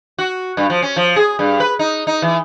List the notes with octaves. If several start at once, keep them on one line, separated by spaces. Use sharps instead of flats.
F#4
G2
F3
C#4
F3
G#4
G2
B4
D#4
D#4
E3